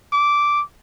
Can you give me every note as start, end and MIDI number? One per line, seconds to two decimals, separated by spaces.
0.12 0.62 86